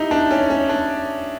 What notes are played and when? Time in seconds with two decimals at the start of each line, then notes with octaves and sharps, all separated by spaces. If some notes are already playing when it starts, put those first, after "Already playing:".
Already playing: D#4 E4 G4
0.11 D4
0.31 C#4
0.50 C#4
0.69 D4